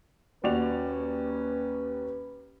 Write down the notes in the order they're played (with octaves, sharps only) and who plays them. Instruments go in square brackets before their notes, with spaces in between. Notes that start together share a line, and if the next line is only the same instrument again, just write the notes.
[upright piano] D#2 D5 F7 [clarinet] C#4 [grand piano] F#4 [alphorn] B4